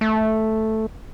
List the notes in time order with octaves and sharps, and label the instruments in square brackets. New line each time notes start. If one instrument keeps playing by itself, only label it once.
[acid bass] A3